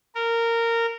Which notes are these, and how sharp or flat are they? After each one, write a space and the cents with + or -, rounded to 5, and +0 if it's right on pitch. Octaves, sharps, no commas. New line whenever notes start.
A#4 -15